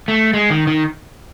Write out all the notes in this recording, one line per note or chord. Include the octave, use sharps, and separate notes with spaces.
A3
G#3
D#3
D#3